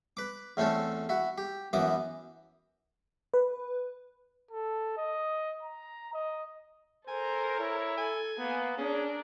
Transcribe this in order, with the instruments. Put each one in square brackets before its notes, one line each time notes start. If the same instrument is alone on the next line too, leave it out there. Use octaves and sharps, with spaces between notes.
[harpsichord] B4 D6
E2 A3 C4 C#4 A4
E4 F#4
G4
F#2 E3 B3 D6 D#6
[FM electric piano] B4
[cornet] A4
D#5
A#5
D#5
[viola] A4 A#4 [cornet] C5 [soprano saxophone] G#5
[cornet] E4 [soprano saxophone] C#5
[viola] A4 [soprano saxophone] G#5
[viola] A#3 [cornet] B3
[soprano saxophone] C#4 [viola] D4 A#4 [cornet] G#4